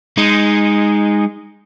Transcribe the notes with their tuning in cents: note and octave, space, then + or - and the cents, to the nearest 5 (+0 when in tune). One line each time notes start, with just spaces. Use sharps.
G#3 -15 D#4 +0